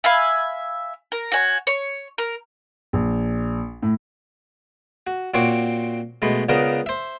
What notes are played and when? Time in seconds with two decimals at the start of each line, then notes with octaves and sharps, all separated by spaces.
0.04 E5 F5 G#5 B5
1.12 A#4
1.32 F#4 C#5 G#5
1.67 C#5
2.18 A#4
2.93 A#1
3.82 A2
5.07 F#4
5.34 A#2 C4 F#4 C#5 C#6 D6
6.22 B2 G#3 A3 B5
6.49 C#2 C#3 B3 D4 A#4 D#5
6.86 C5 E5